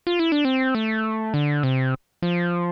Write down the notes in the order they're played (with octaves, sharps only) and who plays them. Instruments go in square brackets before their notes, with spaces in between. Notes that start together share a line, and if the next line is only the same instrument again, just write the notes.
[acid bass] F4
E4
D4
C4
A3
D3
C3
F3